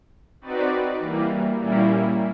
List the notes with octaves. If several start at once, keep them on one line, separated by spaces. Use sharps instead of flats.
C4 D#4 F#4 B4 D5
E3 G3 A#3
A#2 G3 A#3 C#4 E4